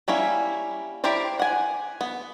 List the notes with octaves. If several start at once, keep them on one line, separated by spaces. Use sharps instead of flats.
G3 A#3 C#4 E4
E4 G4 A#4 C5 D5
F#5 G#5
B3